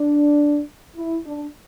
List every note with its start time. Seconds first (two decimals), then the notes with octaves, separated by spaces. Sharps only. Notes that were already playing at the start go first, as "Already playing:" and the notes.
Already playing: D4
0.95 E4
1.25 D4